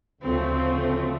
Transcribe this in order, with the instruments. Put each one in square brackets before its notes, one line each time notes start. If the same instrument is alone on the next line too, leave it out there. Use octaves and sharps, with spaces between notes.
[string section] D2 C#3 F3 A3 [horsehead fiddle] C4